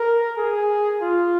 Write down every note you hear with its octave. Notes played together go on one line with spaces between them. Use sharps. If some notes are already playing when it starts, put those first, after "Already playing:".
Already playing: A#4
G#4
F4